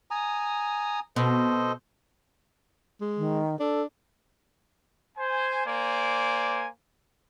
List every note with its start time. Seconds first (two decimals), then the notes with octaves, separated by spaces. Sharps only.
0.11 G#5 A#5 D#6
1.16 B2 A4 C5 D#5
3.01 G#3
3.17 D#3
3.60 D4 A4
5.17 C5 G#5
5.66 A#3 C5 D5 G#5